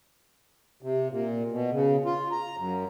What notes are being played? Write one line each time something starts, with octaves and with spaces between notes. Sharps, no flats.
C3
A#2
B2
C#3
F4
A#5
F#2